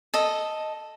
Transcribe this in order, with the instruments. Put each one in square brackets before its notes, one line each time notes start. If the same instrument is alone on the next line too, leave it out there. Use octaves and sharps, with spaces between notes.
[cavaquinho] A4 D#5